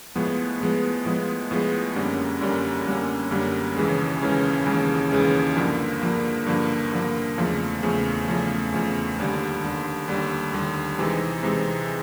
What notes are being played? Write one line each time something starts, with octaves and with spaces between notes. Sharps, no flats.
A2 F3 G#3 B3
A2 F3 G#3 B3
A2 F3 G#3 B3
A2 F3 G#3 B3
F#2 D3 G3 A#3 C#4
F#2 D3 G3 A#3 C#4
F#2 D3 G3 A#3 C#4
F#2 D3 G3 A#3 C#4
D#2 C#3 E3 G#3 C#4
D#2 C#3 E3 G#3 C#4
D#2 C#3 E3 G#3 C#4
D#2 C#3 E3 G#3 C#4
G2 D3 F3 A#3
G2 D3 F3 A#3
G2 D3 F3 A#3
G2 D3 F3 A#3
E2 C#3 F3 A3
E2 C#3 F3 A3
E2 C#3 F3 A3
E2 C#3 F3 A3
D#2 D3 G3
D#2 D3 G3
D#2 D3 G3
D#2 D3 G3
C3 E3 G#3 C4 D#4
C3 E3 G#3 C4 D#4